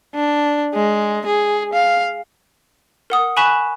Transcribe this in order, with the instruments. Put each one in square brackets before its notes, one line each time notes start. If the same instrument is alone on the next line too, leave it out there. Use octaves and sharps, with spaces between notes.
[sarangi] D4
G#3
G#4
F5
[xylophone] A#4 F#5 D#6
G#5 B5 C#6 F#6 B6 E7